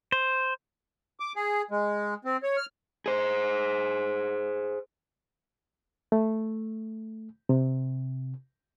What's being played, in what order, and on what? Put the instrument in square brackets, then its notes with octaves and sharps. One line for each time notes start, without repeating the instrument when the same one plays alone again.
[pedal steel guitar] C5
[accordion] D6
G#4
G#3
C4
C#5
F6
[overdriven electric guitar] G#4 C5
[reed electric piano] A3
C3